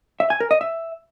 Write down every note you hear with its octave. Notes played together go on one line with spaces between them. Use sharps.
E5
G#5
A#4
D#5
E5